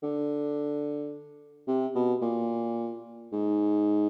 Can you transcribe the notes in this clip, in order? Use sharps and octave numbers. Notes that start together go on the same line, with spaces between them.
D3
C3
B2
A#2
G#2